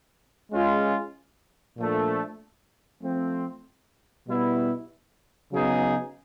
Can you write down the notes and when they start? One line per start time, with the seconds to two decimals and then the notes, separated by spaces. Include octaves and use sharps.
0.52 G#3 C#4 F4 G#4
1.78 A#2 F3 A3 D4
3.02 F3 A3 C4
4.28 B2 G3 B3 E4
5.53 C#3 F#3 B3 D#4 G#4